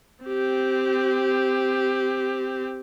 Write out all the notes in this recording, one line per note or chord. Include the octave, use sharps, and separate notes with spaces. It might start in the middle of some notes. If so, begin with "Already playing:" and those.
C4 G4